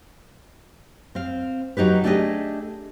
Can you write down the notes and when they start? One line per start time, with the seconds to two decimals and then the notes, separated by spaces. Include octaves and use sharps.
1.15 C4 F5
1.77 F#3 D#4 G4 B4
2.04 A3 D4 G4 G#4 D5 D#5